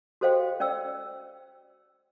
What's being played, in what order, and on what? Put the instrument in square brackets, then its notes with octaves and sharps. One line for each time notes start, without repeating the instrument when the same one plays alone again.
[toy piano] F#4 A4 C5 D#5 F5 G5
C#4 D5 G5 E6